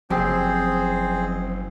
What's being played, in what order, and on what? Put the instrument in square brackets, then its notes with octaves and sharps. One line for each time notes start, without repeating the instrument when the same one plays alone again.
[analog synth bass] F#1 [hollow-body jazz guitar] F2 C3 G4 [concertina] C4 G#4 C5